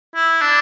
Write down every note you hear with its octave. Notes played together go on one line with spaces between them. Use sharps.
E4
D4